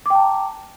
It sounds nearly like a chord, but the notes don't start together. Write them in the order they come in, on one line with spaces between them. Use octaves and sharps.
D6 G5 A5 A#5